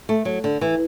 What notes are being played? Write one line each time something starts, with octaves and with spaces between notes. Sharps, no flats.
A3
F#3
D3
E3